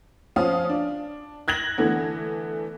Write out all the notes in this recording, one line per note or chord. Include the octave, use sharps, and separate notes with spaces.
F3 C#4 F5 D#6
D4
F#6 G#6 A#6 F#7
D3 E3 A3 B3